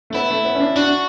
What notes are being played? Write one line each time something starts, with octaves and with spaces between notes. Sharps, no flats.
A3
B3 E4
A3
B3
C#4
D4
D4 F#4
D4